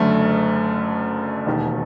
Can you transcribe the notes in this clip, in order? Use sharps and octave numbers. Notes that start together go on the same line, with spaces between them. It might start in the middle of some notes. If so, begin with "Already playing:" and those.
Already playing: F#1 F#2 D3 A3
E1 D#2 D#3